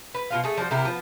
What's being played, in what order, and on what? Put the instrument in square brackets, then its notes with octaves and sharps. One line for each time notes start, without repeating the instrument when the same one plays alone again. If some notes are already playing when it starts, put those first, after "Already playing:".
[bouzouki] B4
B2 F4 F5
A3 G#4
F3 G3 F#4 C5
C3 E4 G4 A#4
F3 B3